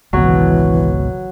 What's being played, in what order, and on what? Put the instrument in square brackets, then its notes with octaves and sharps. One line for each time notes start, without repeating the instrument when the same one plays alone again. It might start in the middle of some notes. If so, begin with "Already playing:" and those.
[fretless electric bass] G#1 C#2 B2 [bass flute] E3 [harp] F#3